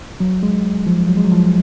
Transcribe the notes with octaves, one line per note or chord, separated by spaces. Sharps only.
F#3
G#3
F3
F#3
G#3
F#3
F3